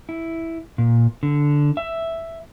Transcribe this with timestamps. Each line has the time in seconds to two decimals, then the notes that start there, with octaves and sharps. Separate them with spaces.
0.09 E4
0.78 A#2
1.23 D3
1.77 E5